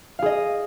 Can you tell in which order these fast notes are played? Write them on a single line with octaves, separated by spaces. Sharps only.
F5 G#4 D#5